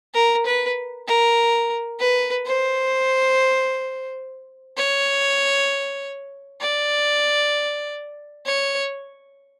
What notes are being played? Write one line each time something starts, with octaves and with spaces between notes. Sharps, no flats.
A#4
B4
A#4
B4
C5
C#5
D5
C#5